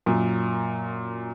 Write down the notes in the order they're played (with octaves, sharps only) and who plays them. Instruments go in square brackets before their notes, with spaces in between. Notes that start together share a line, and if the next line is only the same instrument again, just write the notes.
[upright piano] F#2 A#2